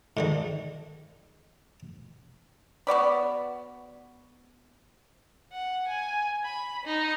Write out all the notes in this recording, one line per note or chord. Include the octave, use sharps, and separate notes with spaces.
G#2 D3 D#3
B3 F#4 D5 B5
F#5
G#5
B5
D#4